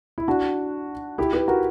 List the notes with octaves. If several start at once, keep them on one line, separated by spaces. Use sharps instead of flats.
E4
D4 F#4
E4 G4
G4 B4
F#4 A#4